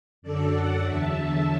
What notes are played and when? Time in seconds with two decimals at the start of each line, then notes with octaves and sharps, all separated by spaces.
0.22 F#2 D3 F#3 A4 D5
0.53 D5 F#5
0.83 E2 D3 F#3 E5 A5